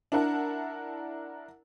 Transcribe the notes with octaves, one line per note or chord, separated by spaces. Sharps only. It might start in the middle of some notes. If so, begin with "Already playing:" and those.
D4 E4 A#4 F#5 A5